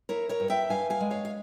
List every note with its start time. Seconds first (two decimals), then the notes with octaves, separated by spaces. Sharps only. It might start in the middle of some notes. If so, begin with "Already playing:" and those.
0.09 E4 A#4 C#5
0.29 A#4 C#5
0.40 G2
0.50 E5 G5
0.70 G2 F5 G#5
0.90 F5 G#5
1.01 G#3
1.11 C#5 F5
1.25 F5